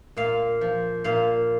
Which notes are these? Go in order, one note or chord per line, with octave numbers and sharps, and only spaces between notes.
A#2 F5
F3
A#2 F5